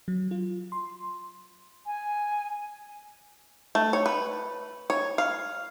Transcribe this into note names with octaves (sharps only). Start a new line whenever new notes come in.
F#3
F4
C6
G#5
A3
C#5
B4
C#5
F5